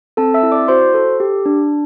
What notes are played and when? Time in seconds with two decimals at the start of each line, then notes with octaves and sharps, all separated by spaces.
0.17 C4 A4 A5
0.34 E5 E6
0.43 E4
0.52 D5 D6
0.68 F#4 C5 C6
0.94 A4
1.20 G4
1.46 D4